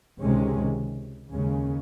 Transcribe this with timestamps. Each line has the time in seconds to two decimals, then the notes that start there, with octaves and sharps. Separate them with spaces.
0.21 C#2 C3 D#3 G#3 C#4
1.31 D#2 C#3 G#3 C#4